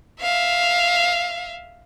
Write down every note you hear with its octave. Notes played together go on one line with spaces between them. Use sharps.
E5 F5